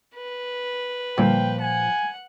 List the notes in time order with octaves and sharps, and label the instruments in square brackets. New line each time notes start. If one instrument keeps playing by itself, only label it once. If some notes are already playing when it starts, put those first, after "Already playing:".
[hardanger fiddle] B4
[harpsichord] G2 D3 [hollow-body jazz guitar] A#2 F3 [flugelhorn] G5
[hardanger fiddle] F#5 [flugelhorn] G#5